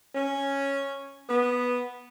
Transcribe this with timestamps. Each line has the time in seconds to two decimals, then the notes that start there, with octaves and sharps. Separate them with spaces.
0.15 C#4
1.29 B3